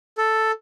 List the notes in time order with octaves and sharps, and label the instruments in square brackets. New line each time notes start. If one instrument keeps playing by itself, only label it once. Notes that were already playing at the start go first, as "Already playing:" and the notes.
[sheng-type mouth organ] A4